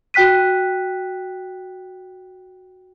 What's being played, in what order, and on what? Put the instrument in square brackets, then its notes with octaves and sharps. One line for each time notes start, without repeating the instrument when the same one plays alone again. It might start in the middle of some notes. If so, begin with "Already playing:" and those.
[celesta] F#4 G5 F#6 B6 D#7